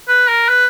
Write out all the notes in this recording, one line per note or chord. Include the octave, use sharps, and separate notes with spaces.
B4
A#4
B4